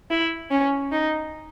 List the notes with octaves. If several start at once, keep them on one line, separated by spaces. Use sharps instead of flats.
E4
C#4
D#4